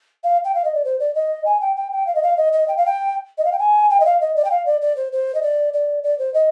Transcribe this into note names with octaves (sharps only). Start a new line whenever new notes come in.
F5
G5
F5
D#5
D5
C5
D5
D#5
G#5
G5
G5
G5
F5
D#5
F5
D#5
D#5
G5
F5
G5
D#5
F5
G5
G#5
G5
D#5
F5
D#5
D5
G5
F5
D5
D5
C5
C5
D#5
D5
D5
D5
C5
D#5